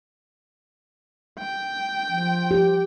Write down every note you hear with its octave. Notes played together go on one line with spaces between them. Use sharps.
G5
F3
G4